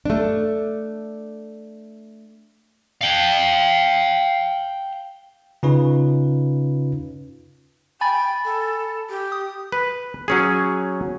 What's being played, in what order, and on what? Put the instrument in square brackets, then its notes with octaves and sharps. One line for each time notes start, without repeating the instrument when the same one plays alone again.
[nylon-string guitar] A3 D4
[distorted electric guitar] F5 G5
[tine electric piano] C#3 C#4 D#4 F4 B4
[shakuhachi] G5 [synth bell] G#5 B5 A6
[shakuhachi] A4
G4
[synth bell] D#6
[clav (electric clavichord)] B4
F#3 C#4 G#4